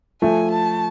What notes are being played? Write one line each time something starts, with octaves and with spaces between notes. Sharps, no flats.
F3 A3 G#5
A5